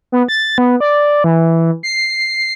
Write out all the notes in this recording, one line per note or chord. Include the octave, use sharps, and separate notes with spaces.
B3
A6
B3
D5
E3
C7